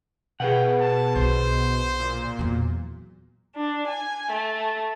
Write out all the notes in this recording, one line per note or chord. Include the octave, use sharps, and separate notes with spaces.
B2 G#4 B4 F#5 G5
A5
B1 D3 C5
A#2
E2 F#3
D4
G#5
A3